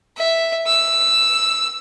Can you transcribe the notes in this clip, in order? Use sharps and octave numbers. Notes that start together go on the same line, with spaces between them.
E5
E6